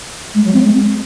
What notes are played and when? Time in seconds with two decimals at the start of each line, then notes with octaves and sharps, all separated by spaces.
0.34 G#3
0.44 F#3
0.53 C4
0.63 G#3